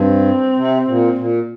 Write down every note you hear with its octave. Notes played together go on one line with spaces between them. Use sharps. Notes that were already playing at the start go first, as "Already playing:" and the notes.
Already playing: G2 C4
C3
A#2
A#2